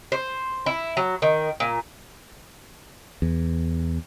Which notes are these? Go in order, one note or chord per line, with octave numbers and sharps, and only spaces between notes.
C5
E4
F#3
D#3
A#2
E2